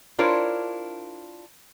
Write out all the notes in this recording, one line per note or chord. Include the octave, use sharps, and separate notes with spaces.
D4 E4 F4 A#4 C5 C#5